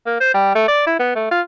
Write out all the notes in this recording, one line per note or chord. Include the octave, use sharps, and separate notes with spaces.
A#3
C5
G3
A3
D5
E4
B3
A3
F4